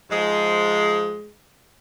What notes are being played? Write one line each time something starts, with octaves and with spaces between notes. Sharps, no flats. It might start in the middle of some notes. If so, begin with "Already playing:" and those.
G#2 F3 G#3